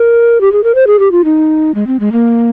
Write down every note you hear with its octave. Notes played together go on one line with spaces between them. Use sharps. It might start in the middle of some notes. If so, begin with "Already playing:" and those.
Already playing: A#4
G4
G#4
A#4
C5
G#4
G4
F4
D#4
G#3
C4
G#3
A#3